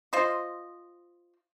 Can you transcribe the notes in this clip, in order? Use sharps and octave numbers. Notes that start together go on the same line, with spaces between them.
F4 C5 D#5